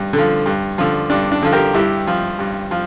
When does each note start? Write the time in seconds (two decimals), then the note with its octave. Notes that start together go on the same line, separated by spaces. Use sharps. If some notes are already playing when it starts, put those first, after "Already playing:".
Already playing: G2
0.13 D3
0.18 F3
0.46 G2
0.78 D3 F3
1.10 G2 D4
1.32 D4
1.43 D3 F3
1.53 G4 A#4
1.74 G2 E4 G4
2.07 F3
2.39 G2
2.71 F3